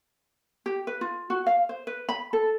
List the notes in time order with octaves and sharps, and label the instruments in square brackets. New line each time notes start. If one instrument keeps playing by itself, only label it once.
[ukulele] G4
B4
F4
F#4
F5
C5
B4
B5
A4